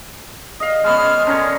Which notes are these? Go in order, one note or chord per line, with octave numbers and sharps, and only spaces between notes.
D#5 F5
G#3 B3 C#4 F6
D3 C#4 A#4